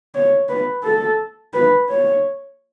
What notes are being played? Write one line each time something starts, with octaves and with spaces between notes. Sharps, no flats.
C#5
B4
A4
B4
C#5